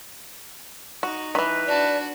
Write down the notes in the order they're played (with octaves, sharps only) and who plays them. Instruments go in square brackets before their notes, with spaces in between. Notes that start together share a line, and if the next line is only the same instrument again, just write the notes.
[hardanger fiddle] D#4 [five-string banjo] F#4
[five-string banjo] D#3 E3 [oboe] B4
[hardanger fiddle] D4 F#4 [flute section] D5 A5